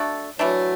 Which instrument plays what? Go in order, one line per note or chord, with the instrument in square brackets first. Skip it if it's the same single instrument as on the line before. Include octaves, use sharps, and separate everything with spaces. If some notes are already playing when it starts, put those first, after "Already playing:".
Already playing: [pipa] A3 D4 F#4 A4
[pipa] E3 A3 D4 [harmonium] F#3